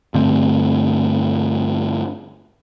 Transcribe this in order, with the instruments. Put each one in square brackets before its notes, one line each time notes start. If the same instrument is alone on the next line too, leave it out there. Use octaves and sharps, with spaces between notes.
[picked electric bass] G2 D3 A3 C4